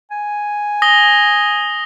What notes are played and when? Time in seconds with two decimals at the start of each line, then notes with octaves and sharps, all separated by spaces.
0.11 G#5
0.82 D#6 A#6 G7